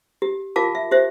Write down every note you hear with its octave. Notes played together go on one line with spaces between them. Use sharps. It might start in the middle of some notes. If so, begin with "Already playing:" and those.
G4
F4 G4 A#4 F5 A5 D6
E5
G4 C5 E5